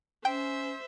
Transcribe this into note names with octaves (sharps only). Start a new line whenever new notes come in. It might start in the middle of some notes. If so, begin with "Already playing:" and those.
C#4 C5 E5 G5